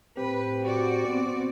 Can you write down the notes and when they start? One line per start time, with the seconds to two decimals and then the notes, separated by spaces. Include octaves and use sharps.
0.17 A2 C4 G4 B4
0.64 F#4 D5
1.07 B3 C4